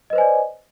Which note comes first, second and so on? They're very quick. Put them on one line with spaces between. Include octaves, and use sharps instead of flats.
D#5 B4 C5 G#5 D5